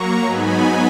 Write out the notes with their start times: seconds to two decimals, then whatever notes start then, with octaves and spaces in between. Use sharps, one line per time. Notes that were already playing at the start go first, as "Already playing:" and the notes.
Already playing: F#3 A#3 A#5 C#6
0.23 G#2 F#3 B3 D#4 G#5 B5